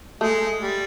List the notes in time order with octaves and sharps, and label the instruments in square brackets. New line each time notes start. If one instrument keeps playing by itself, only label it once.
[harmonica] G#3 [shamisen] A3
[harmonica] G3